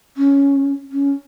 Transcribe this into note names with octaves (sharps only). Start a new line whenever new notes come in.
C#4
C#4